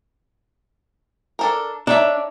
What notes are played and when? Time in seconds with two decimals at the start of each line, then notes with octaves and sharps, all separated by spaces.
1.39 D4 A4 A#4
1.87 D4 D#4 C#5 E5